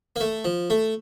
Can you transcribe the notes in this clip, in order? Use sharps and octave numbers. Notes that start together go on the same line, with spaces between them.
A#3
A3
F3
A3